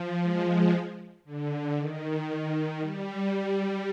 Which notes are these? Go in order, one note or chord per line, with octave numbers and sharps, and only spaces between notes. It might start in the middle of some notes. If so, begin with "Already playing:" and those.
Already playing: F3
G#3
D3
D#3
G3